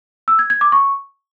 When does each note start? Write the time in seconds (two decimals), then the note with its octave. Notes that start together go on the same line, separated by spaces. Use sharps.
0.28 E6
0.39 G#6
0.50 G#6
0.61 D6
0.72 C#6